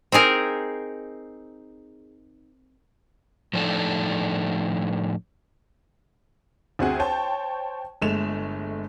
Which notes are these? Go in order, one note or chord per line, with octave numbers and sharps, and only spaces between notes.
C4 D#4 G#4 A#4
A2 F3 D4 D#4 A4
D2 C4 F#4 G#4 F#5
C5 C#5 G5 A5
G1 G#3 A3 E7 F7